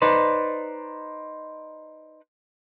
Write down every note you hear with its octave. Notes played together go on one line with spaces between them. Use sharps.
D#4 B4 C5 D5